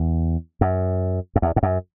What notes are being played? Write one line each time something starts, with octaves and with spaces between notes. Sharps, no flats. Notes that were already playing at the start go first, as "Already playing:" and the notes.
Already playing: E2
F#2
F#2
E2
G#2
F#2